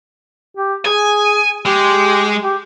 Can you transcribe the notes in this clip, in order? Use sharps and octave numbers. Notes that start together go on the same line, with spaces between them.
G4
G#4 G#5
G#3 G4
G4